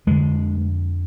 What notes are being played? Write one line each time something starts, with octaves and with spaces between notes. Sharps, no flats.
F2 D3 G#3